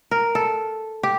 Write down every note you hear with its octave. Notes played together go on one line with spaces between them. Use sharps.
A#4
A4
G4